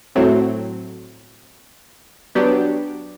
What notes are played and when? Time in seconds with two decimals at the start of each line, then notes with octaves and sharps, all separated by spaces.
0.16 A2 F#3 A3 C4
2.35 F#3 B3 D4 G4